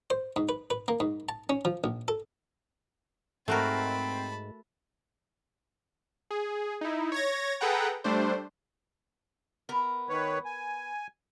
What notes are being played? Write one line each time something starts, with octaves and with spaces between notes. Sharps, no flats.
C5
G#2
B4
B4
A#3
G#2
A5
C#4
F3
A#1
A4
G#2 A3 C4 F#4 A#4 A5 B5
G#4
D#4 E4
C#5 G#6 A#6
G#4 A4 B4 F#5 G5 A#5
G3 A3 D4 C5
B3 A#4
D#3 B4 C#5
G#5